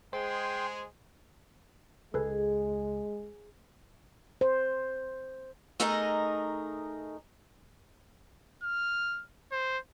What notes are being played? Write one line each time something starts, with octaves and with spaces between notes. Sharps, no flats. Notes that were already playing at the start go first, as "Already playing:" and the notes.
G#3 G#4 C5 G5 C6
C#2 G#3 G#4 A4 B4
C5
A3 D#4 G#4 A#4 D#5
F6
C5